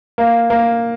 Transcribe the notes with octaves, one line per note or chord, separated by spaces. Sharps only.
A#3
A#3